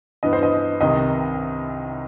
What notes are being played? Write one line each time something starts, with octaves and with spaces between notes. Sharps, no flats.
G2 E3 B3 D#5
C5
D#5
C2 C3 D#3 D#5